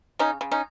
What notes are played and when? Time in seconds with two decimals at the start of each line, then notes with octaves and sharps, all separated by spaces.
0.19 C#3 C#4 D#4
0.41 C#3
0.52 C#4 D#4